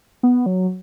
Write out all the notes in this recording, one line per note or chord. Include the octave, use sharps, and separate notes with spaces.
B3
F#3